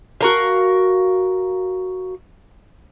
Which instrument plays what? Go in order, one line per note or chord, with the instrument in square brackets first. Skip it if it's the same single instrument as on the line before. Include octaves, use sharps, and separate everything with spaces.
[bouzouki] F#4 A#4 F5